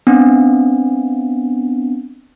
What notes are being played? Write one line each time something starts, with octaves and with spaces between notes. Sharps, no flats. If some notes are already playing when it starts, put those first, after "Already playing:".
B3 C4 D4